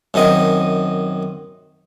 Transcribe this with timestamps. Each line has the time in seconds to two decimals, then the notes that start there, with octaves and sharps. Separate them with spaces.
0.14 F#2 D#3 C4 D#5 G#5